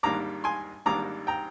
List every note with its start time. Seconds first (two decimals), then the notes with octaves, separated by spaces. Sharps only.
0.03 G#1 G#2 G3 A#3 D4 A#5 D6
0.44 G#5 C6
0.86 G#1 G#2 G3 A#3 D4 A#5 D6
1.27 G5 A#5